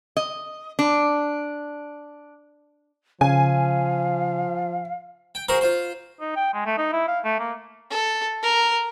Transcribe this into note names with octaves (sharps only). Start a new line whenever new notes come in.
D#5
D4
C#3 F3 F5 G#5
G5
F#4 G#4 A#4 C5 A#5
F4 C5
D#4
G5
G#3
A3
D#4
E4
F5
A3
A#3
A4
A#4